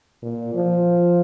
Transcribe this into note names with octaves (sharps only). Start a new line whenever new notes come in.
A#2
F3